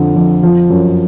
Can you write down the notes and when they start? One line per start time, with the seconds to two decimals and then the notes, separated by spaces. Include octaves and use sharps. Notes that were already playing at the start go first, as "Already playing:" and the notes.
Already playing: F2 D3 F3
0.16 F2
0.43 F3
0.70 F#2